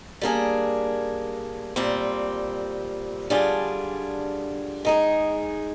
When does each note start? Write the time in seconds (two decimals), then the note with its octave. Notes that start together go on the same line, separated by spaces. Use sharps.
0.21 G3 A#3 D4 G#4
1.76 A#2 G3 C4
3.30 D3 G3 D4 F4 G#4
4.85 G#3 D#4 G#4